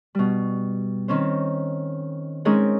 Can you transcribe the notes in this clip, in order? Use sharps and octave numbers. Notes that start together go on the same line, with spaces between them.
B2 G3
D#3 C4 C#4 C5
G#3 C4 C#4 D#4 G#4 A#4